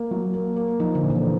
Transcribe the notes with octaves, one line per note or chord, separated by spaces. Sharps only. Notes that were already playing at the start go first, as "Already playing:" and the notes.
Already playing: A#3
F#3
A#3
A#3
F3 D#4
D3
A#2
E3